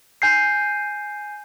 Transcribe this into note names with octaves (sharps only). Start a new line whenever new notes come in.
G#5 G6 C7